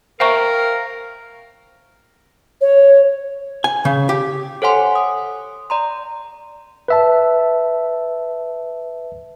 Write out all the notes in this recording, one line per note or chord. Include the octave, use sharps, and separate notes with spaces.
A#4 C5 E5 F5 G5 A#5 C#6
C#5
G#5
C#3
G4
A4 C5 C#5 F#5 G#5 C6
D#6
D5 A#5 C6
B4 E5 A5